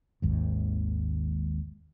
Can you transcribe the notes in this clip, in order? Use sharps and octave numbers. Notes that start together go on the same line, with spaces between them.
G#1 D#2 G#2